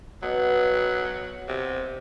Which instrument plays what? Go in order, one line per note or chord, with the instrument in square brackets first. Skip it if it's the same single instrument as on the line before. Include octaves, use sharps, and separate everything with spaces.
[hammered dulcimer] B2 [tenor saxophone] F#3
[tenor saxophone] C3